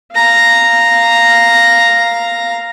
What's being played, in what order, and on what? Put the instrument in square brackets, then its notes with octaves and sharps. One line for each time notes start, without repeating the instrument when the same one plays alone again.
[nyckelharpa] F5 A#5